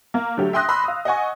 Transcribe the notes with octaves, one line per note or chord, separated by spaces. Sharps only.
A#3
D3 F#3 A3 G4
E5 G5 C6 D#6 F#6 A#6
B5 C6 E6
F5 D#6
D#5 F#5 G#5 C#6